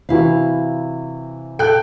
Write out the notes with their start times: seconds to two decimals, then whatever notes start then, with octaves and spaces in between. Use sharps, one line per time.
0.09 C3 E3 E4 F#4 F5
1.59 A4 G5 F#6